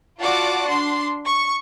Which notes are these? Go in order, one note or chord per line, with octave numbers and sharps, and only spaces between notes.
F4 F#4 D5 F#5 A5 D6
D4 C6
C#6